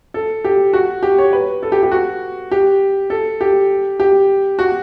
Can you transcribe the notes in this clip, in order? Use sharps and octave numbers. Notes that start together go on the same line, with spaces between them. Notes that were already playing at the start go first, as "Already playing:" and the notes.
A4
G4
F#4
G4
C#5
B4
A4
G4
G4
F#4
G4
A4
G4
G4
F#4